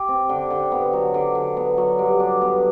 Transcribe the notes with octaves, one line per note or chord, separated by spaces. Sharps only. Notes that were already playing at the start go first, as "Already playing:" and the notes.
Already playing: G4
C4
D3
D3
B3
F#3
D3
D3
B3
F#3
G2
D4
B3